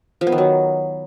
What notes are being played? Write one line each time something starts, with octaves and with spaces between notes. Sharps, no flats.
F3
B3
D#3
F#3